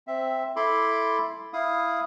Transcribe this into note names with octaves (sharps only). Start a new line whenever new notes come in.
C4 E5
E4 A4 B5 C6 D6
E4 F5 D#6